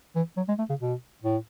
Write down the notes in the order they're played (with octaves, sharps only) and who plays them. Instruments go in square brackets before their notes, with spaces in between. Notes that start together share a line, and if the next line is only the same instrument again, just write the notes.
[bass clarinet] E3
F#3
G#3
A3
C#3
B2
A2